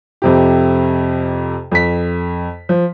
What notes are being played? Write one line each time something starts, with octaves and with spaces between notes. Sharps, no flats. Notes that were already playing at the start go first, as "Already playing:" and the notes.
F2 C3 G4
F2 B6
F3